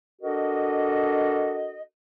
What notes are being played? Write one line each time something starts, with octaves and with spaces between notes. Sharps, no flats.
D4 F#4 A4 A#4 D#5